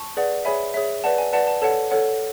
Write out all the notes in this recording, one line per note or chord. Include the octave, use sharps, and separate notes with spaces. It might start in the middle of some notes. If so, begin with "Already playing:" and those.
Already playing: A5 C#6
G#4 B4 D5 F#5
G#4 C#5 E5 G#5 B5
G#4 C#5 E5
B4 D5 F#5 A5
G#5
B4 D5 F#5 A5
A5
A4 C#5 F#5 A5
A4 C#5 F#5